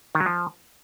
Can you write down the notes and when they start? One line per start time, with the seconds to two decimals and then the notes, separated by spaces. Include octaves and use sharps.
0.15 D#3
0.20 F#3
0.26 F3